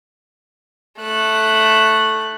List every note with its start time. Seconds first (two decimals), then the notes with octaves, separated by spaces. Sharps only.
1.00 A3 F#6